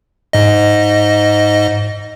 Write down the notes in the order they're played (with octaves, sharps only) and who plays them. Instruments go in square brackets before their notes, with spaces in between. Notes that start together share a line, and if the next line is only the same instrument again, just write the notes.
[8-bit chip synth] G#2 D#5